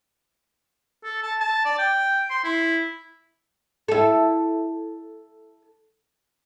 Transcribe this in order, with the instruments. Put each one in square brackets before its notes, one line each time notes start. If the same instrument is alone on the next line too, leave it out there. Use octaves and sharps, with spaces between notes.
[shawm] A4
A5
A5
D5
G5
C6
E4
[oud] E4 A4